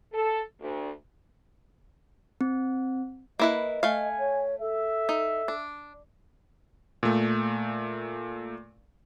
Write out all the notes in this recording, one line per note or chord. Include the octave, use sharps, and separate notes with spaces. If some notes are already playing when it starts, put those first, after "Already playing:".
A4
D2
C4
A#3 E4 B4 D#5
A3 F5 G#5
C#5
A4 E5
D#4
D4
A#2 A3